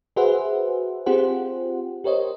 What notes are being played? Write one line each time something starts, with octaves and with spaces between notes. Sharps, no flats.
F#4 G#4 B4 C5 E5 F#5
C4 F4 G4 G#4 C5 F#5
G4 A#4 C5 C#5 D#5